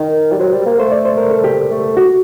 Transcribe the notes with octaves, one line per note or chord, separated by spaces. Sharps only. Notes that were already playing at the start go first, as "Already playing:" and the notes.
Already playing: D#3 A#4
G3
F#3 C5
G3
A#3
A3 C5
D5
C5
A#4
A4
G4
A3
F#4